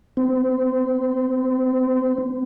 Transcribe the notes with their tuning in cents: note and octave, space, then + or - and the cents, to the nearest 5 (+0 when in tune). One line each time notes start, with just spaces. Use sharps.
C4 -30